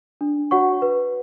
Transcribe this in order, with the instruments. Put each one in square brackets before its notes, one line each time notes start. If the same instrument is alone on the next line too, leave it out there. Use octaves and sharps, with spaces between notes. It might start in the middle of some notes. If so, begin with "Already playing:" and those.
[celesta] D4
F#4 C#5 F#5 C#6
B4